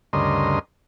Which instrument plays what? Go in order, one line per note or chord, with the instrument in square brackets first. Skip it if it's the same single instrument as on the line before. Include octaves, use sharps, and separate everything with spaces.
[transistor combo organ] D2 G2 C#3 A#4 D#5 C6